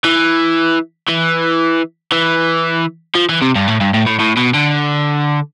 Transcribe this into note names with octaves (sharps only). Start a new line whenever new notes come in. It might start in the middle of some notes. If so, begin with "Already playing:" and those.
E3
E3
E3
F3
E3
C3
G2
A2
G2
A2
A2
A2
B2
D3